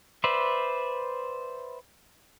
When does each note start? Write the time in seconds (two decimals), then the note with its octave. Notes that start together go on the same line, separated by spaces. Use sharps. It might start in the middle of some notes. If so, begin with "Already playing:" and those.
0.24 B4 C5 D5 E5